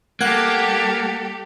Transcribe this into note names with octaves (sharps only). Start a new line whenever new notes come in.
G3 A#3 G4 A4 F#5 F#6 G#6